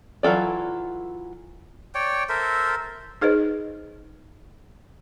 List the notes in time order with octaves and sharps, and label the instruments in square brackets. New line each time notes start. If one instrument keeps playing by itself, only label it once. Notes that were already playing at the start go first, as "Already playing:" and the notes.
[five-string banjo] E3 F#3 F4 A4 D5
[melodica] C#5 D5 G5
A4 A#4 C5 E5
[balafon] D#4 G#4 B4 C5 D#5